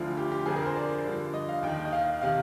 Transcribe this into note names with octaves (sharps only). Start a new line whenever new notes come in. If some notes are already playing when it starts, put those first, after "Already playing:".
Already playing: D2 D3 F3 F4
G4
G4
F2 D3 F3 G#4
A#4
C5
D5
G2 D3 F3
D#5
F5
D#2 D#3 G5
D#5
F5
C3 D#3 F5